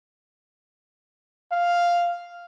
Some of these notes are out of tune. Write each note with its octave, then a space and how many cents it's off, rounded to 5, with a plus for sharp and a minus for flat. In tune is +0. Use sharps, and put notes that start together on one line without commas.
F5 +0